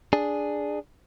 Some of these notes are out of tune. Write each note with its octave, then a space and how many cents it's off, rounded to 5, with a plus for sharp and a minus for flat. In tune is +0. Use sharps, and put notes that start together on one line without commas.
D4 +0 G#4 +0